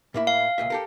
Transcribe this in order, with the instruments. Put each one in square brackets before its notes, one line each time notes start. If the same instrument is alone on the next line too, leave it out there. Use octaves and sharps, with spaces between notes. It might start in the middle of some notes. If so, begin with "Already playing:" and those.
[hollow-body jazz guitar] A2 A#3 E4
[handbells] F5
[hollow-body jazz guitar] C#2 A#2 E5
G4 A4 A#4